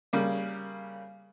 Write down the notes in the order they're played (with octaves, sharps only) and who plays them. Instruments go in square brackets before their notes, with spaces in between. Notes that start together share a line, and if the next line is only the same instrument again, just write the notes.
[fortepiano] C#3 G3 A#3